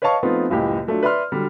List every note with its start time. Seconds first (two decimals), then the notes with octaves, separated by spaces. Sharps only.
0.02 B4 C#5 D#5 F5 A5 C#6
0.23 F3 A3 B3 C4 D#4 F4
0.50 F#1 C#2 A2 G4 D#5
0.87 F#3 A3 D4 F4
1.03 B4 D5 E5 B5 C6 F6
1.32 D3 F#3 G3